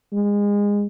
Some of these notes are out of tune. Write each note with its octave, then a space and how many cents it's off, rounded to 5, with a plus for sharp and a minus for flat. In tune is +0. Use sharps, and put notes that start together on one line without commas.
G#3 -25